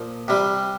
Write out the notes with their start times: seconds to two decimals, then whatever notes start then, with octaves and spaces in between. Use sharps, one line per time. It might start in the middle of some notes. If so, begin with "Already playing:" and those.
Already playing: A#2 F3
0.28 C3 G3